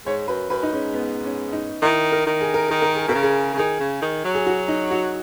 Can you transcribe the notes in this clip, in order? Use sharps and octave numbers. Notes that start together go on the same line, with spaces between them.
G#2 C#5
F#2 B4
F#2 B4
D#4
G#2 C#4
B3
C#4
D#4
D#3 E4
A#4
D#3
G#4
A#4
D#3 G#4
A#4
G#4
B2 A#4
C#3
G#4
C#3
D#3 G#4
C#3
D#3
F#3
G#4
F#4
D#4
F#4